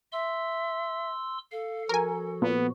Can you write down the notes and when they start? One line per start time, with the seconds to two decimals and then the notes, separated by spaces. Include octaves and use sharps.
0.12 E5 C6 E6
1.52 A4 F5
1.89 F3 F#4 A#4 G#5
2.42 A#2 B3